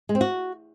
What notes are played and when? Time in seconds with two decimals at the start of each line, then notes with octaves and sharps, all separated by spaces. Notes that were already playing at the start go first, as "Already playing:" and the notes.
0.09 G#3
0.15 C4
0.21 F#4